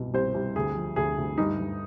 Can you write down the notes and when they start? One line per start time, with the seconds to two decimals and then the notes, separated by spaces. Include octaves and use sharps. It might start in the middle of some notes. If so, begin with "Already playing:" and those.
Already playing: C2 B2
0.14 C2 C5
0.35 C2
0.56 D2 G#4
0.76 F3
0.96 D2 G#4
1.18 D2
1.38 G2 D#4
1.58 G2